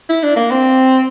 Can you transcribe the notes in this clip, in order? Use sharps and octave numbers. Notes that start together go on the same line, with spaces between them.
E4
D4
A#3
C4